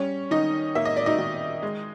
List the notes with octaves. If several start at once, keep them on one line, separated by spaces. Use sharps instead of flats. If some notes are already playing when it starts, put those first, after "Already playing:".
Already playing: G3 C#4 C#5
D#3 D#4 D#5
A#3 E5
D#5
D5
D#4 D#5
D#3
G#3